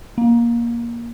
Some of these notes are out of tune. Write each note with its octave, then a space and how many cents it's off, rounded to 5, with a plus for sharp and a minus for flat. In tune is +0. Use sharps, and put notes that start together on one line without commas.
A#3 +15